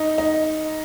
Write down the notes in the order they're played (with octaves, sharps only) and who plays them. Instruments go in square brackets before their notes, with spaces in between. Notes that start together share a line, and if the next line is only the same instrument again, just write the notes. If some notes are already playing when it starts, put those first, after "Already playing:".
Already playing: [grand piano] D#4
D#4